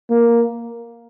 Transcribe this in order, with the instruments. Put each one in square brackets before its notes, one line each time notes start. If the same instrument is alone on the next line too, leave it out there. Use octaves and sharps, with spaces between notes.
[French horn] A#3